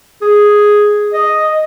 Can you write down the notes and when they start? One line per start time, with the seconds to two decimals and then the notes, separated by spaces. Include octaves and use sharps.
0.22 G#4
1.13 D#5